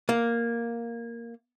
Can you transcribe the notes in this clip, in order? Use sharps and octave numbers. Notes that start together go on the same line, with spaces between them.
A#3